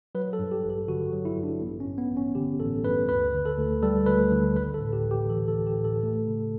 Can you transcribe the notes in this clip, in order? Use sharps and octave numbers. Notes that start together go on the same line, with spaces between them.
F#3 B4
A4
G2
G4
A1
A4
D3 F#4
F#4
F#3
E4
G2
D4
A1 B3
C#4
G2
B3
A1
C#4
D3 G4
A1 A4
G2 B4
D2 B4
D3
A4
D2
G3 A4
D2 B4
D3
A1 B4
A4
A2
G4
A1
G4
E3 A4
A4
A1
G4
A2
A4
A3
C#3